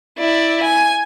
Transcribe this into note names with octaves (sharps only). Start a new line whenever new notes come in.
E4 D5
G#5